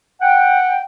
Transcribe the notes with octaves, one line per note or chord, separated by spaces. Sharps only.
F#5 G5